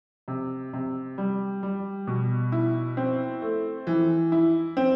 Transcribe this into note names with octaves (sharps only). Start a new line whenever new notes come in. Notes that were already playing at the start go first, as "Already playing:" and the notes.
C3
C3
G3
G3
B2
E4
C4
A3
E3
E4
C4